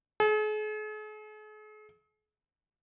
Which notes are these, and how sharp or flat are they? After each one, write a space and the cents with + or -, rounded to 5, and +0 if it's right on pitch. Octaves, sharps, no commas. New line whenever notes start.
G#4 +45